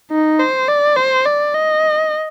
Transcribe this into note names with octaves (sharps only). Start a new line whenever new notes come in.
D#4
C5
D5
C5
D5
D#5